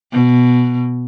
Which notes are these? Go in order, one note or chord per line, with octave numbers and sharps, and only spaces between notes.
B2